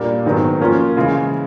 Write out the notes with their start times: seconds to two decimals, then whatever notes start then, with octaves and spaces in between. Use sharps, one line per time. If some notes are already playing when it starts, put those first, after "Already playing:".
Already playing: A#2 G3 A#3 D4
0.25 G#2 D#3 F#3 B3
0.61 F3 A#3 C#4 F4 A#4
0.96 C#3 E3 G#3